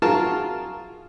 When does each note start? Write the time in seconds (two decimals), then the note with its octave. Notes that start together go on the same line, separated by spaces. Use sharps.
0.02 F4 F#4 G#4 A#4 A5